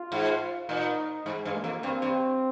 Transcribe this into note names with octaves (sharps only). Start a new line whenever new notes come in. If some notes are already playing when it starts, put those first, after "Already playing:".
Already playing: F4
G#2
A#2 D#4
G#2 G#3
G2
A#3
F2
G2 C4
G2